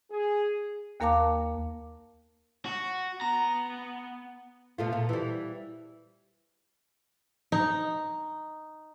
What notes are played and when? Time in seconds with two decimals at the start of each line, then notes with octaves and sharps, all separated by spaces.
0.10 G#4
1.00 D#2 A#3 A#4 F5 A5 D6
2.66 F#4
3.21 B3 A#5
4.78 B2 A3 F4
4.93 A#2
5.09 E3 G3
7.52 D#4